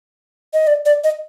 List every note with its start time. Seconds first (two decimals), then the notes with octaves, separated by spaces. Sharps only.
0.54 D#5
0.67 D5
0.86 D5
1.04 D#5